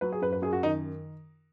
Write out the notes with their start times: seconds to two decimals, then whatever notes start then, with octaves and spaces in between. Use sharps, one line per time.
0.01 F#3 B4
0.12 G#4
0.22 F#2 B4
0.33 B4
0.42 F#2 G#4
0.53 F#4
0.63 D#3 D#4